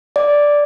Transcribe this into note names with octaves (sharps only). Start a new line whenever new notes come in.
D5